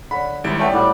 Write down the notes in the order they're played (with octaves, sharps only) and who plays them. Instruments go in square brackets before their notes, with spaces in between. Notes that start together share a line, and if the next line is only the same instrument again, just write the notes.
[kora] D3 C#5 [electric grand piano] B5
[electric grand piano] G#1 G3 D7 [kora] E4
[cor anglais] A3 [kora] B3 C#4 A4 [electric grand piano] D5 G5
[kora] A2 F#4 C5 [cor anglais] G3